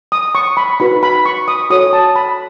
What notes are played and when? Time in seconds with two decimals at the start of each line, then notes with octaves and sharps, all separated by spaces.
0.12 D#6
0.35 C#6
0.57 B5
0.80 D#4 F#4 B4 B5
1.03 B5
1.25 C#6
1.48 D#6
1.70 F#4 A4 C#5 D#6
1.93 A5
2.16 B5